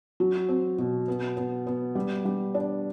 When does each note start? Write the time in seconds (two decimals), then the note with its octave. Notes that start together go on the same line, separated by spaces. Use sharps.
0.20 F#3
0.49 C4
0.78 B2
1.08 B3
1.37 B3
1.67 B3
1.95 G3
2.25 G3
2.54 D4